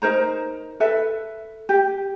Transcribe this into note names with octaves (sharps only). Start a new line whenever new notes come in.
D#4 A#4 C5 A#5
A4 B4 E5
G4